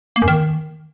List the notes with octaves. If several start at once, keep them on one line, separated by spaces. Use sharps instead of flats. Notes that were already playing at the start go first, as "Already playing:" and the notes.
A#3
F#2
D#3